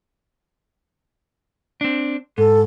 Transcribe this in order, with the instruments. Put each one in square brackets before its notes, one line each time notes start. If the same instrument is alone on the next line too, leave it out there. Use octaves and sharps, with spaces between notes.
[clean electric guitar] C4 D4
[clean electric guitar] G#2 [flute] A4